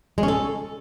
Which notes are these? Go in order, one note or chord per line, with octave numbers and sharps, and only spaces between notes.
G#3
C#4
A4